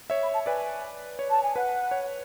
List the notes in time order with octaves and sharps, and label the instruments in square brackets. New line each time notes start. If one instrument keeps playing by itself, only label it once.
[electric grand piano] C#5 E5
[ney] B5
A5
[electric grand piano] B4 D5 [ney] G#5
[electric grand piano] C#5
[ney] A5
G#5
[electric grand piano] B4 [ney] F#5
[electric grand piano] C#5